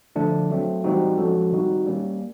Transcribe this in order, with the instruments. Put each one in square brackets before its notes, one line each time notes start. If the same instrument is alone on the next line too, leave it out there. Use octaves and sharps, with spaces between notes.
[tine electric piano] D3 F3 A3 D4
F#3 A3 C4
E3 G3 C4 D#4 F#4
F3 G#3 C#4 F#4 A4
D#3 G3 C4 D#4 F#4
G3 A#3 C#4